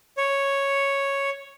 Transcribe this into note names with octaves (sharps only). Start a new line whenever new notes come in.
C#5